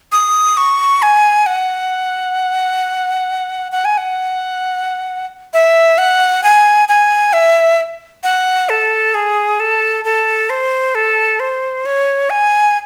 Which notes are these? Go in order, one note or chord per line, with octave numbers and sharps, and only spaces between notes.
D#6
C#6
G#5
F#5
F#5
G#5
F#5
E5
F#5
G#5
G#5
E5
F#5
A4
G#4
A4
A4
C5
A4
C5
C#5
G#5